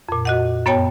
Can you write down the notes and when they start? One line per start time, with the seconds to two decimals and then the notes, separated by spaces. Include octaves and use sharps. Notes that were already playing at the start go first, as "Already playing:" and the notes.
0.09 F2 A#2
0.25 F#4 D#5 F#5
0.66 F#2 B3 C#5 G5 A5